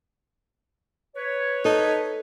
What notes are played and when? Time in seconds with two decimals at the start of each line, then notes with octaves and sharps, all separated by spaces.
1.16 B4 C#5
1.65 D#4 A4